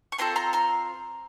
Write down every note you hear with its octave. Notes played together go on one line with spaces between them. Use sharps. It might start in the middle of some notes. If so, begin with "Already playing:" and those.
C#6
C4 F4 A4 A#5 C6
A#5 C6
A#5 C6